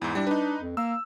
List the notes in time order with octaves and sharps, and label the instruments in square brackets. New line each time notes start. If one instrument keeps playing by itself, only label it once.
[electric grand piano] E2 G#2 [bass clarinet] E4
[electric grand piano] G3 D4
[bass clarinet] D4 [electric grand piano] D#4 B4
[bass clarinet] F2
[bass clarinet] A#3 [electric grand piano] E6